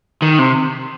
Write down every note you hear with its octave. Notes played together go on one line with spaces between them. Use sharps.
D#3
C3